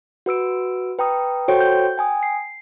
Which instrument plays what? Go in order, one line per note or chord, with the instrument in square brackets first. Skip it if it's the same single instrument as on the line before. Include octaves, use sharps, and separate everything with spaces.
[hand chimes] F#4 B4 E6 D7
B4 G5 A#5 D#6
F#4 A4 C5 C#5 G5 D7
G6
G5 G#5 D#6
C7